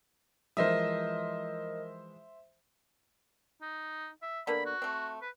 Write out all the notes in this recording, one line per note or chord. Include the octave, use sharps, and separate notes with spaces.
E3 F3 G#3 A#4 C5 D#5 E5 D#6
D#4
E5
D3 A#3 B3 B5
F#4
A3 C4
B4